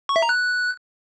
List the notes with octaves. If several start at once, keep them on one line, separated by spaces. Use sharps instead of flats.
C#6
E5
A#5
F#6